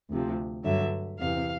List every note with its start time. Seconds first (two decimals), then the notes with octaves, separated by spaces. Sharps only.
0.11 D2 C3 F3
0.65 G2 D3 F#3 E5
1.19 E2 C3 E3 F5